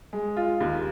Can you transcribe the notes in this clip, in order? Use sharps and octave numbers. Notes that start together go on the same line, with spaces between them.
G#3
F4
D#2